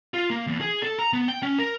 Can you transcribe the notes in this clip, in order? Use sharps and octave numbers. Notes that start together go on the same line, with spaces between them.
F4
A#3
E2
G#4
A4
A#5
B3
G5
C#4
A#4